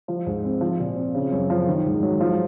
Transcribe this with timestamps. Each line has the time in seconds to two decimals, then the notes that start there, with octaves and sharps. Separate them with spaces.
0.08 F3
0.26 G#2
0.44 C4
0.61 F3
0.80 A#2
0.96 C4
1.14 C#3
1.32 F#2
1.50 F3
1.67 D#3
1.86 G#2
2.03 F#3
2.21 F3